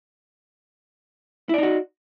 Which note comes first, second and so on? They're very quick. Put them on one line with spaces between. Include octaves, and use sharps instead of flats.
E4 D5 D#4 F#4